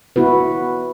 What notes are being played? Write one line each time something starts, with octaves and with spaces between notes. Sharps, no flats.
B3 E4 F#4 B4